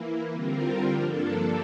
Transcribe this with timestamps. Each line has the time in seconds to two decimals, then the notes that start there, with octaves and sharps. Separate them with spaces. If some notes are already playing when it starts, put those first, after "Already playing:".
Already playing: E3 A#3 E4
0.30 D3 G3 C4 F4 A#4
0.91 G2 F3 A#3 D4 A4